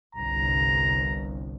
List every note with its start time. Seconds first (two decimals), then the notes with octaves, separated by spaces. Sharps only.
0.15 G1 C2 A#5